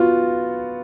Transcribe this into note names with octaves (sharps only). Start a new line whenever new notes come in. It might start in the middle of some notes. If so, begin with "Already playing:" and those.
Already playing: B3 F4 F#4